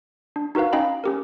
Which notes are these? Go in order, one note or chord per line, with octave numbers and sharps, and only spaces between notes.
D4
D#4 F#4 A#4 B4 F5
C#4 D#4 D#5 F5 G5 B5
C#4 G4 A#4